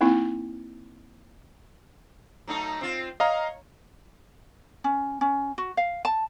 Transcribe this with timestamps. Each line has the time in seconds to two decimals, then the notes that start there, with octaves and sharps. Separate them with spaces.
0.01 A#3 C4 D#4 E4
2.47 F#3 A3 D#4
2.81 C4 F4
3.20 C#5 D#5 F5 A#5
4.84 C#4
5.21 C#4
5.58 F#4
5.77 F5
6.05 A5